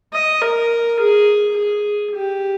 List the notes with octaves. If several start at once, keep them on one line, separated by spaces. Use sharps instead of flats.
D#5
A#4
G#4
G#4
G4